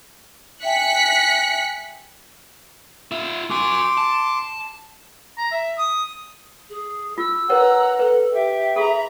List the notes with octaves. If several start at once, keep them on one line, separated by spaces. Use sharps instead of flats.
E5 G5 G#5 F#6 B6 C#7
F4 E5
F#4 G#5 C6 D6
A5
A#5
E5
D#6
G#4
F4 E6
A#4 B4 C#5 F#5 A#5
A4 B4
G4 E5
G#4 A4 A#5 B5